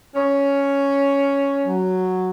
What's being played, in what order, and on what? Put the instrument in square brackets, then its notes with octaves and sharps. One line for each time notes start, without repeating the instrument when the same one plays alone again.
[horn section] C#4
F#3